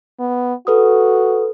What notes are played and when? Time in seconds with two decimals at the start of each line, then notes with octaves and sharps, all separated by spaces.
0.19 B3
0.67 F#4 A4 B4 D#6